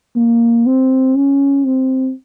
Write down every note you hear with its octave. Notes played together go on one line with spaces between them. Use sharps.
A#3
C4
C#4
C4